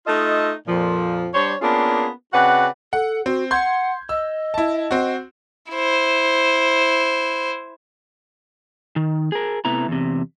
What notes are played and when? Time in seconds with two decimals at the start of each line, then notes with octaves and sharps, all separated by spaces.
0.07 A3 D#4 F4 A4 D#5
0.67 F2 A#2 F3
1.34 G3 D4 C5 C#5
1.61 A#3 B3 C#4 D4 F4 G#4
2.33 C#3 C4 F#4 B4 D5 F#5
2.93 A4 F#5
3.26 C4 F#4
3.51 F#5 C6 G6 G#6
4.09 D#5 E6
4.54 E4 A5
4.91 C4 F#4
5.71 E4 C5
8.96 D#3
9.32 G#4 A#4
9.65 C3 A3 B3 E4 A#5
9.88 E2 C3